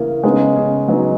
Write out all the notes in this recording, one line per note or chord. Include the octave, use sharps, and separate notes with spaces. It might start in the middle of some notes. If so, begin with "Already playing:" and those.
Already playing: C#3 E3 A#3 E4 A#4
C#3 G#3 B3 D#4
C#3
F#3 G#3 B3 D#4